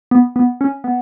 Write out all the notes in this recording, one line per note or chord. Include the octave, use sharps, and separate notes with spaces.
B3
B3
C#4
B3